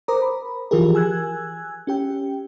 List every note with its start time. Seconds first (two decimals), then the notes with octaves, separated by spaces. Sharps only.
0.08 A#4 C5 A#5 D6 D#6
0.22 B5
0.71 E3 F3 F4 G4 G#4 A#4
0.95 G#5 E6 F#6 G#6
1.87 C#4 G4 G5